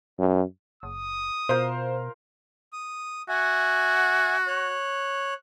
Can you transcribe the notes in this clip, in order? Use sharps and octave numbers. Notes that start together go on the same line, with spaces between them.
F#2
F#1 D#6
B2 F4 A#4 C5 F5 G6
D#6
F#4 E5 F#5 G#5
C#5 F#6